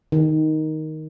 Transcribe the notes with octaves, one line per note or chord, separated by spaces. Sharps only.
D#3